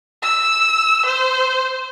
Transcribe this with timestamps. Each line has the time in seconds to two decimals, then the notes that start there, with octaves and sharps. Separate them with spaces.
0.23 E6
1.06 C5